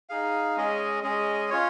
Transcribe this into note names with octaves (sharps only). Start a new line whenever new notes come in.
D#4 G#4 F5
G#3 C#4 G#4 D#5
G#3 C#4 G#4 D#5
C#4 F4 C#5